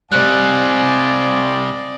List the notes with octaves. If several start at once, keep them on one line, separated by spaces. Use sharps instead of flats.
C3 G3 C5 D5 D#5 F5 G#5 F#6